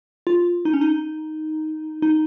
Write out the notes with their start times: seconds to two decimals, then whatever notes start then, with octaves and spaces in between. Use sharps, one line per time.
0.27 F4
0.65 D#4
0.74 C#4
0.81 D#4
2.02 D#4